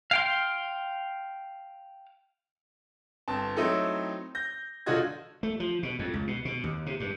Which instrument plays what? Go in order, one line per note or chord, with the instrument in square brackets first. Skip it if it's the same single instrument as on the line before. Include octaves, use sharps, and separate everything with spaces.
[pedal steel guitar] F5 G5 C6
[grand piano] G1 C4 A5
F#3 A3 C4 D#4 E4 A4
G6 A#6
E1 D3 F4 F#4 D#5 G#6
[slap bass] A3
F3
B2
F2
C#2
B2
B2
D#2
C3
G2